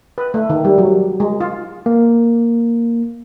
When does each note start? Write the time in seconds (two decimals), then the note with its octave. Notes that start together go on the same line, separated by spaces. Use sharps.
0.18 B4
0.34 A3
0.50 D#3
0.65 G3
0.78 F#3
1.20 G#3
1.41 F4
1.86 A#3